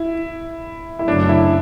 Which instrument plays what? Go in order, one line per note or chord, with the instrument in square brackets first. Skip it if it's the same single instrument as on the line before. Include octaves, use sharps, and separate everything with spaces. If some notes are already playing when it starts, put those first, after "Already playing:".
Already playing: [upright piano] E4
E4
[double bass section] F#2 C#3 F#3 A3 [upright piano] D4
[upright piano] E4